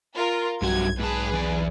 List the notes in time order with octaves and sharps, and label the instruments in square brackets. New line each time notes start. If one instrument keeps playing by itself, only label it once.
[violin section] F4 A#4
[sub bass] B1 [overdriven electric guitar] G2 F#4 [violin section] G#6
[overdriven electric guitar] G#2 A5 [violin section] G#4 B4
[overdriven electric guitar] E2 D5